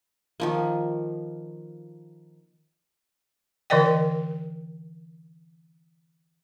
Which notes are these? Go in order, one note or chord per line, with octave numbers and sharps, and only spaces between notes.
D#3 F3 A#3
D3 E3 A#4 D5 D#5 G5